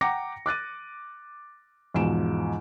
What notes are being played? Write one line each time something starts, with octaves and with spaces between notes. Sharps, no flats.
F#5 G5 A#5 D6 A#6 C#7
D6 F#6 A6 D#7
E2 G#2 B2 F3 D7 E7